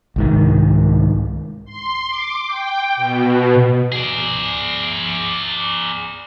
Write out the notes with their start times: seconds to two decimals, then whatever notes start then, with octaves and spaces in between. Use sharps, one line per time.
0.16 C2 G#2 D#3
1.65 C6
2.08 D6
2.47 G5
2.96 B2
3.92 G#4 D5